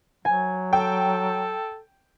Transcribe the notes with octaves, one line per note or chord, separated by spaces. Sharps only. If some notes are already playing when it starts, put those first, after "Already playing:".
F#3 G#5
A4 G5